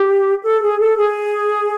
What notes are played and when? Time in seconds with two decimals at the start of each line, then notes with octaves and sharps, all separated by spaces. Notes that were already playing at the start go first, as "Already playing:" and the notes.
Already playing: G4
0.44 A4
0.61 G#4
0.79 A4
0.97 G#4